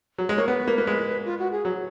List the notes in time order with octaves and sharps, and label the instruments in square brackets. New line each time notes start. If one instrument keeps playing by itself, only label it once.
[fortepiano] F#3
G#3
[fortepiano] A#3 [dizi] C#5
[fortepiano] B3 [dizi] B4
[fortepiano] A#3
A#3
G#3
[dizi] F4
F#4
G#4
[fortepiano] F#3